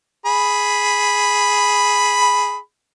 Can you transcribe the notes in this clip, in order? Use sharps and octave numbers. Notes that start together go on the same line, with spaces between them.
G#4 B5